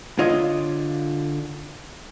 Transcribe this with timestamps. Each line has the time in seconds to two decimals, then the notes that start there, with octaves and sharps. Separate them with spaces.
0.19 D3 F4 C#5 D#5